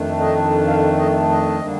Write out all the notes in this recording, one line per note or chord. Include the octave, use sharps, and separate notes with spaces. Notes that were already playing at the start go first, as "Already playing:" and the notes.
Already playing: F2 D#3 A3 D4
D#5
F5
D#5
D#5
D3 G3 A#3 D4